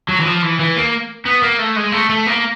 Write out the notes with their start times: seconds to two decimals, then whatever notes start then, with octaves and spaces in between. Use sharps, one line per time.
0.09 F#3
0.20 E3
0.25 F3
0.42 E3
0.60 E3
0.76 A#3
1.26 B3
1.43 A#3
1.59 A3
1.76 G#3
1.92 A3
2.10 A3
2.27 A#3